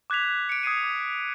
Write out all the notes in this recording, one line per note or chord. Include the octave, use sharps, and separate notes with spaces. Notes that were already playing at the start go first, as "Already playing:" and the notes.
D6 F#6 G#6 B6 F7
C#7 D7
D#6 G#6 C7 D#7
D6